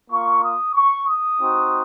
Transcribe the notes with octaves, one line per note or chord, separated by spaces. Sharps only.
A#3 F4 C#6
D#6
C#6
D#6
C4 D#4 F#4